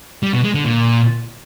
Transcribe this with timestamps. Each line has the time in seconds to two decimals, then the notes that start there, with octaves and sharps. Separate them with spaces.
0.23 G3
0.33 B2
0.44 G#3
0.54 D3
0.65 A#2